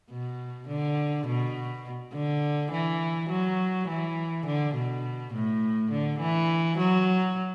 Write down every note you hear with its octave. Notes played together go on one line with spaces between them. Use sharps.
B2
D3
B2
D3
E3
F#3
E3
D3
B2
A2
D3
E3
F#3